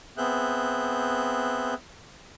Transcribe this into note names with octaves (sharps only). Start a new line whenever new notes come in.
B3 C4 G#4 E5 F#6 G6